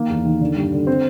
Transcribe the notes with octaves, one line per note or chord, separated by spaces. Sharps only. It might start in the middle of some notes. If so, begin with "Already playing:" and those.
Already playing: D#3 A#3
E2
D#3
D3
G2
D3
C4